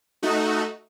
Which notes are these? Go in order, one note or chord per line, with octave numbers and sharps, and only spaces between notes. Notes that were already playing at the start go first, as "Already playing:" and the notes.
A3 D#4 F#4